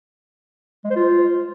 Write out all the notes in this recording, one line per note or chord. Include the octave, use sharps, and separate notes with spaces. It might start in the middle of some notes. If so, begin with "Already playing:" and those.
G#3
C5
F4